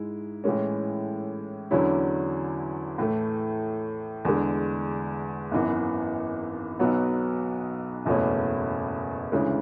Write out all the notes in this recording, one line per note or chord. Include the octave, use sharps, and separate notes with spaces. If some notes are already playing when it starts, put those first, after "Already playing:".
Already playing: G#2 G#3 E4
A2 E3 G#3 C#4
E2 D3 F#3 C#4 E4
A2 E3 A3
E2 D3 G#3
G#1 F#2 E3 B3
B1 B2 F#3 B3
F#1 E2 B2 A3 C#4
D2 C#3 E3 G#3 C#4